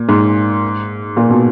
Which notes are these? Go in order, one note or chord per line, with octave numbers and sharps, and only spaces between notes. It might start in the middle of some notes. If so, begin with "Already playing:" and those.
Already playing: A#2
G#2
A#2
B2